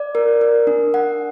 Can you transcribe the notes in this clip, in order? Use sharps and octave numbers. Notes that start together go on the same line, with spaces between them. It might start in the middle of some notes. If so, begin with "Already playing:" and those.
Already playing: D5
A#4
A#4
D4
F#5